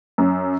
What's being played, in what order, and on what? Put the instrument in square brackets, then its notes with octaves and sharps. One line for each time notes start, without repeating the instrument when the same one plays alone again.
[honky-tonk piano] F#2